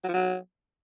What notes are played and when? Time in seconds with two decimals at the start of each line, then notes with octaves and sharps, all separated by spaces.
0.04 F#3
0.09 F3
0.14 F#3